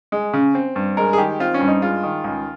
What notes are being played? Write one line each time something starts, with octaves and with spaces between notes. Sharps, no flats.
G#3
C#3
C4
G2
G#3 A#4
G#4
D#3 G4
C4 F4
C#4
G2
D#4
G#3 F4
D#3
C#2